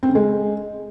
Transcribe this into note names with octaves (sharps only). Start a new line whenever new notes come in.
C4
C#3
G#3